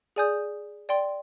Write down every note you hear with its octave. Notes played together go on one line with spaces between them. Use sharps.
G#4 D5 G#5 D#6 G6
D5 G5 C6